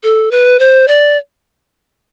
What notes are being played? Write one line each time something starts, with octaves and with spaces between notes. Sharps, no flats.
A4
B4
C5
D5